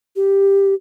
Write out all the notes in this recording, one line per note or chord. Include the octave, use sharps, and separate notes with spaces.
G4